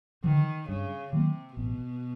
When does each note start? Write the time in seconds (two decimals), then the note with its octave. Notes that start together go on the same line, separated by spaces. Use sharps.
0.24 D3 D#3 F3
0.68 G2 C#3
1.12 C3 D#3 F#3 A#3
1.57 A1 B2